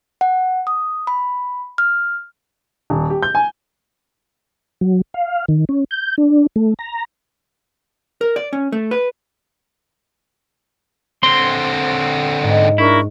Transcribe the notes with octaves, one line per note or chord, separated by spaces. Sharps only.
F#5
D#6
B5
F6
D#1
G4
G6
G#5
F#3
F5
D#3
C#4
G6
D4
A3
A#5
A#4
D5
C#4
A3
B4
D3 C4 C6
G#2
D4 E4 A#4 C#6